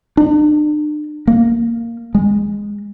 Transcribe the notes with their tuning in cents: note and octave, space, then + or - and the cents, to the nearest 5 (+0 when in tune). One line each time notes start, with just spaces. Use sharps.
D4 +40
A#3 -10
G#3 -15